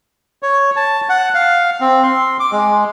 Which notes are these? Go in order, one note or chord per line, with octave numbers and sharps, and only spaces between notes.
C#5
A5
F#5
F5
C4
C6
D6
G#3